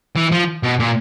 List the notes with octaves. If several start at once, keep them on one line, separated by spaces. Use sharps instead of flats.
E3
F3
B2
A#2